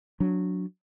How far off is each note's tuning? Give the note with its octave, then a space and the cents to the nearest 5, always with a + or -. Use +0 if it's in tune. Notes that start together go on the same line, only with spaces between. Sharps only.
F#3 -15 D4 -15